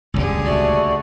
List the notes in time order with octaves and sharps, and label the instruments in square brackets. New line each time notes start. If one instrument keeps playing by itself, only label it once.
[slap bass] D#1 G#1 C#2 [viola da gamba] D3 G4 G#4
[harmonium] A3 F#4 [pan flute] D5